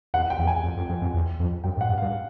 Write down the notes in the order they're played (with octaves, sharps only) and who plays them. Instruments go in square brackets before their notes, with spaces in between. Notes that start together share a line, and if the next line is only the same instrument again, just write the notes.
[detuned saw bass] E2 [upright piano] F#5
[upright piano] G5
[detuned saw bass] E2
[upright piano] G#5
[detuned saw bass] F2
F2
F2
F2
E2
F2
[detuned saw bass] F#2 [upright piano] G5
[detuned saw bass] G#2
[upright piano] F#5
[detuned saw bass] G2
[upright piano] F5
[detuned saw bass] G2